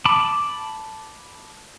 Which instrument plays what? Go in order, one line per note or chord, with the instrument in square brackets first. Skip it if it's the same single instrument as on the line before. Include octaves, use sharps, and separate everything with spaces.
[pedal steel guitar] A5 B5 D6